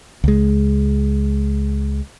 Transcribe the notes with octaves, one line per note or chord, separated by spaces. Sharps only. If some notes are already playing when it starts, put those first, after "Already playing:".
C#2 G#3